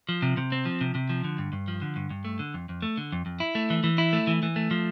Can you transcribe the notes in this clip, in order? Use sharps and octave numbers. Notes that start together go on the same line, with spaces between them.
F3
C3
C3
C4
F3
C3
C3
F3
D3
G2
G2
F3
D3
G2
G2
A3
D3
F2
F2
A3
D3
F2
F2
E4
A3
E3
E3
E4
A3
E3
E3
A3
F3